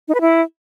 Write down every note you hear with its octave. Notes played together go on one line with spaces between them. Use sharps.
D#4
B4
E4